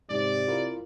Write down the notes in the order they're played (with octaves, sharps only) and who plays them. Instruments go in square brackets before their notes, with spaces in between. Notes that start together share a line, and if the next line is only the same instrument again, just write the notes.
[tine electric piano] G#2 [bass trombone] C3 [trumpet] D5
[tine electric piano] E4 F4 A#4